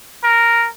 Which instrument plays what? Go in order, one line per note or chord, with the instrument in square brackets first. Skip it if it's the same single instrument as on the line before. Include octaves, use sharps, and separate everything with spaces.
[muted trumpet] A#4